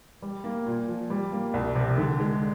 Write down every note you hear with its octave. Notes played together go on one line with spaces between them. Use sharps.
G3
A#3
A#2
F3
G3
A#3
C2
C3
D3
G#3